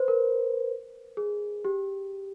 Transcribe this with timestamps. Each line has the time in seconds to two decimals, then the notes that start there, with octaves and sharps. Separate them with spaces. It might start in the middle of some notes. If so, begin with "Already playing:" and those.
Already playing: B4 C5
0.08 A#4
1.17 G#4
1.65 G4